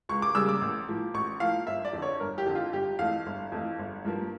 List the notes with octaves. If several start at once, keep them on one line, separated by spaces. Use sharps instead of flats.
C#2 C#6
D6
C#3 G3 A#3 E6
D6
A1
A2 F3 A#3
A1 C#6
A2 F3 A#3 F5
G1 E5
D5
F2 D3
C#5
G1 A#4
G4
F2 D3
F4
G1 G4
F2 E3 A3 F5
G1
F2 E3 A3
G1
G2 F3 A#3